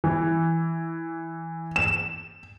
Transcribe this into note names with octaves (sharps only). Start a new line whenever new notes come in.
E3
E7